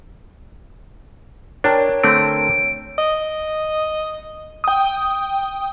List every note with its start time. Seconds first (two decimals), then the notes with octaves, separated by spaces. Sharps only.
1.64 D4 A#4 C#5 G5 A5
2.04 D3 A3 C4 D7
2.98 D#5
4.64 G5 D#6